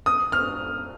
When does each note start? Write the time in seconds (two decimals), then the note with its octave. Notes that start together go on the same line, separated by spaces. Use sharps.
0.06 D#6
0.32 F6